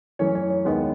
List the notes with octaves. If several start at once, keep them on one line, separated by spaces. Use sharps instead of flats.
F#2 E3 A3 C#4 C#5
C#5
C#5
D#2 D#3 G#3 B3